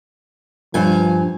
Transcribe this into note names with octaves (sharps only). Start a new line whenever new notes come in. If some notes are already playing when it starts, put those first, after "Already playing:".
G2 F3 G#5